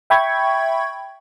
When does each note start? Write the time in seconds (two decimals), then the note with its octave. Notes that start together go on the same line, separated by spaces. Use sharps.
0.10 E5 G5 B5 C#6 G#6